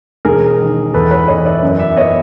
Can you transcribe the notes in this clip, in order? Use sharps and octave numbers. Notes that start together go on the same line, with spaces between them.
E1 G#4 A#4
D#3
E2 A4 B4
B4 C#5
E2 C#5 D#5
D5 E5
F#2
D5 E5
B3 C#5 D#5